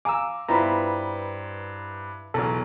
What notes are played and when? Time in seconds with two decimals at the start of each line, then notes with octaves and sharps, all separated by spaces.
0.05 F5 G#5 A#5 D6 E6
0.49 G2 B3 C4 E4 F4 A#5 B5
2.34 B1 E2 F#3 A4